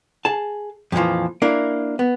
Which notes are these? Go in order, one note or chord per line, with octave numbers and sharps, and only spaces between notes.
G#4 A5
F2 A#2 C#3 E3 F3
A#3 D4 E4 A#4
B3